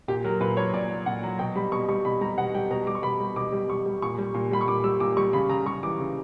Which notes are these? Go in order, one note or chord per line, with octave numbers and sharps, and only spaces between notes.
A#2 G4
F#3 A#4
A#2 B4
F#3 C#5
A#2 D5
F#3
A#2 F#5
F#3
B2 G5
G3 B5
B2 C#6
G3 C#6
B2 B5
G3 A#5
B2 F#5
G3 G5
B2 A#5
G3 D6
C#6
B2 B5
G3
B2 D6
G3
B2 C#6
G3
A#2 C#6
G3
A#2
G3 B5
C#6
A#2 D6
G3 E6
A#2 D6
G3 C#6
C#3 B5
C#3 A#5
G3 C#6
E3 D6
C#3